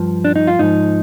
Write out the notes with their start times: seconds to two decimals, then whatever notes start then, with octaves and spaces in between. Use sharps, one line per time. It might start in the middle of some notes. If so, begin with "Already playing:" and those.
Already playing: G2 F3
0.25 D4
0.36 D#4
0.47 F4
0.59 G#2 F3 D#4